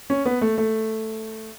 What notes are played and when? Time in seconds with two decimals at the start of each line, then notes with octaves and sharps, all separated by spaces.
0.10 C#4
0.25 B3
0.41 A3
0.58 A3